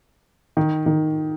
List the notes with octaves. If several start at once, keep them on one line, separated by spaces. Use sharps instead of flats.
D#3
D#3